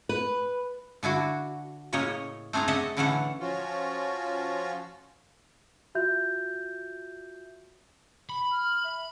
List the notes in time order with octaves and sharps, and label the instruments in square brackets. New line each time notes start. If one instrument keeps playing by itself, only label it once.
[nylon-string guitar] B4
[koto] D3 D4 E4 F#4
A2 C#3 A#3 C#5 D#5
A3 C4 D4 G#4 A#5
C#3 D#5 E5 F#5 A5
A2 D3 E3 C#4 A4 F#5
[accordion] F3 C#4 F4 F#4
[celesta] F4 F#4 E5 G6
[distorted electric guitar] B5
[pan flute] F6
E5